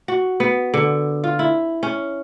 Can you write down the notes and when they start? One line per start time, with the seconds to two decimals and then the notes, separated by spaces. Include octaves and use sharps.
0.08 F#4
0.40 B3
0.74 D3
1.24 F4
1.39 E4
1.83 C#4